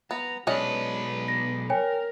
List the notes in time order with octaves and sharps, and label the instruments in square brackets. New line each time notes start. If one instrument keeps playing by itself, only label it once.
[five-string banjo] B3 [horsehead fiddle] A#5
[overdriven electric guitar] B1 B4 [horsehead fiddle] G#3 [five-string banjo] C#4 D4 D#5
[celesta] A#6
[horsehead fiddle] A#4 [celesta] C#5 G5 G#5